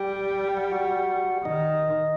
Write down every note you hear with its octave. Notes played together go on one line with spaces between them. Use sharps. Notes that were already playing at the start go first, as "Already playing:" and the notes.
Already playing: G3 G4 G5
F#5
G5
F#4 F#5
D#3 D#4 D#5